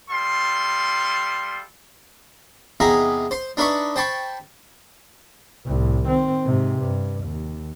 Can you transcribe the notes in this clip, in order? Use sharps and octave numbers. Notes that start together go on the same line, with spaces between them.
G3 A4 F5 C6
E2 C3 D#4 G#4 E5 A#5
C5 C6
D4 D#4 B4 E5 B5 C#6
C5 G5 A5 B5 C#6
C2 A2
D#3 C4
G#2 C3
G2
D#2